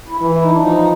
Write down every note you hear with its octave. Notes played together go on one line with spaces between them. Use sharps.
E4
E3
E4
D#4
D4
F3 D#4